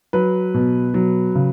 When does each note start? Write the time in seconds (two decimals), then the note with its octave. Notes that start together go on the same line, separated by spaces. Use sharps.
0.13 F#3 B4
0.54 B2
0.94 F#3
1.35 C#3